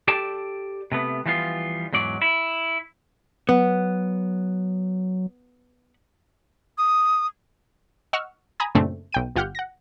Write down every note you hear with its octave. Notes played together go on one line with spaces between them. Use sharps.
G4 A4 D5 G5 A5
C3 A3 B3
E3 F3 G3 B3 F4
E2 G#2 F#3 D5
E4
F#3 B3
D#6
D#5 F#5 C#6 E6 F6
G#5 A#5 B5 D#6 G#6
F#2 A#2 C#3 A3 C4 D4
B1 G5 D#7
G1 F4 G4 F#5 F6 G6
F#5 A#6